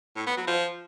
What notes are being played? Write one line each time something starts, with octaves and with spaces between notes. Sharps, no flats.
A2
B3
F#3
F3